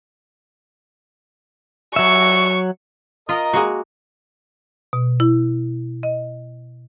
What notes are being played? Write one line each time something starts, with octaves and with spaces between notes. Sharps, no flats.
F#3 E5 C#6
F4 A#4 D#5
G#3 A#3 F#4
B2
E4
D#5